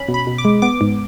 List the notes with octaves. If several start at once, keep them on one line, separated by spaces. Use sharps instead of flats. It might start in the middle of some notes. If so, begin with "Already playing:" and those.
Already playing: C#4 B5
B2
B5
B2
D6
G#3
B3 D6
G#2